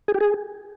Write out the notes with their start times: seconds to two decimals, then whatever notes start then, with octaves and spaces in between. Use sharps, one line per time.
0.08 G#4
0.14 G4
0.20 G#4